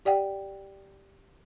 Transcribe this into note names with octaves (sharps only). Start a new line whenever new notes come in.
G4 D5 F#5 G5